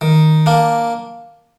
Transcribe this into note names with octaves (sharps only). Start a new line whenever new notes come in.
D#3
A#3 D4